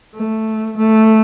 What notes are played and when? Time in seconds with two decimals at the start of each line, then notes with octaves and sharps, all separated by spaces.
0.15 A3
0.77 A3